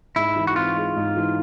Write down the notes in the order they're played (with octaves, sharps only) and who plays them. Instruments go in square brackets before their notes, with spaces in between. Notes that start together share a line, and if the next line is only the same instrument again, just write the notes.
[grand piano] G#2 [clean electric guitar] E4
[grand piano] E3
[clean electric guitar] F#4
[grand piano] C4 [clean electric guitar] F4
[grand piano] G#3
G#2
E3